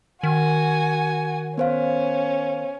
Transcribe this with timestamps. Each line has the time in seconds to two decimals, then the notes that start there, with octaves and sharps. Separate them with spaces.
0.23 D#3 F#4 G#5
1.58 B3 C#4 C5 F5